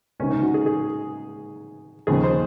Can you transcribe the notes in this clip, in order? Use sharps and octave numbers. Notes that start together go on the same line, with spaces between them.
C#2 C3 D#3 C#4
D#4
F#4
G#4
G#4
D#2 C#3 F3 G#4
C5